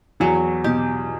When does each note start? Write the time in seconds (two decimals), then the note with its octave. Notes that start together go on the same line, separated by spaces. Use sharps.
0.20 E2 E3 F#3
0.64 B2 G4